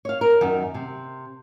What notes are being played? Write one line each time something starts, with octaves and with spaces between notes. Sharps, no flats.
C#5 F5
A#4
F#2 D#3
C3